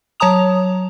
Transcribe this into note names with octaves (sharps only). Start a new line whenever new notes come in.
F#3 C#5 A5 A#5 D#6 F7